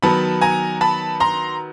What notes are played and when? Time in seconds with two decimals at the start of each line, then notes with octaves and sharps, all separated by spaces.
0.03 D#3 F#3 B3 A5 B5
0.41 G#5 A#5
0.81 A5 B5
1.20 A#5 C6